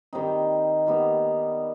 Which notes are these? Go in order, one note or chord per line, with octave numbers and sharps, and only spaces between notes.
D#3 G3 C4 D#4
D#3 G3 B3